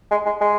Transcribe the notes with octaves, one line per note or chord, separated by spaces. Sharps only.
G#3
G#3
G#3